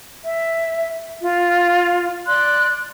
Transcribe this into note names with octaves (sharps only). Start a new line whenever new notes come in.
E5
F4
D5 C6 F#6